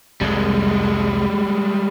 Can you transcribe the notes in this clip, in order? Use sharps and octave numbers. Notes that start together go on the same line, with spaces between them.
C2 F2 G3 G#3